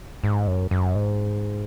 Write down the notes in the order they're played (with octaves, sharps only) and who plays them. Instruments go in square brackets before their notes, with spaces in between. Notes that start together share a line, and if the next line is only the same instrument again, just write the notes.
[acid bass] G#2
F#2
F#2
G#2